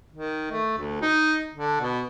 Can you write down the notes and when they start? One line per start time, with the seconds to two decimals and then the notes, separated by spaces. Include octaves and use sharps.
0.13 D#3
0.52 A3
0.78 D2
1.02 D#4
1.54 D3
1.81 B2